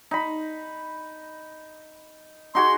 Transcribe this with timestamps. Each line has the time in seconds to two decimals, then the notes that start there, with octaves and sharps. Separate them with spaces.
0.11 D#4 B5
2.55 D#4 F#4 G#4 C6